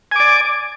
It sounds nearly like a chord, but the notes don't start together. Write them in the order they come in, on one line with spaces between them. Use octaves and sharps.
G#5 D6 D5